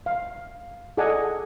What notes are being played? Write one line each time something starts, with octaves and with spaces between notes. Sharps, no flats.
F5
G#4 A4 D5 D#5 F#5 G#5